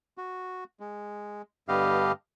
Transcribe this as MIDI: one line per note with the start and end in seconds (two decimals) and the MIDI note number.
0.18 0.64 66
0.80 1.42 56
1.68 2.12 43
1.68 2.12 50
1.68 2.12 59
1.68 2.12 67
1.68 2.12 75
1.68 2.12 77